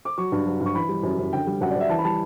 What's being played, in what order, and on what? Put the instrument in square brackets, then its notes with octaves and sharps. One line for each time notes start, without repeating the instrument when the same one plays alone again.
[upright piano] D6
F#3 C#6
G2
F#3
G2
C#6
E3 B5
G3
F#2
F#2
D3 G5
G3
F#2 F#5
D5
F#2
E5
E3 A5
B5
G3 A5